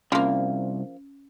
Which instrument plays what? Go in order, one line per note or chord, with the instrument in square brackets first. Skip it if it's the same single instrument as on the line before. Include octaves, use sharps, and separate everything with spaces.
[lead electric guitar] C2 [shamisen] F3 A#3 [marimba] C#4